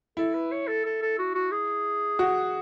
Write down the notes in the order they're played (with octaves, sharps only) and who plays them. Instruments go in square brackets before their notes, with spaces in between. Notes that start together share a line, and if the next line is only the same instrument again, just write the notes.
[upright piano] E4 [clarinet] A4
[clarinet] B4
C#5
A4
A4
A4
F#4
F#4
G#4
[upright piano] F#4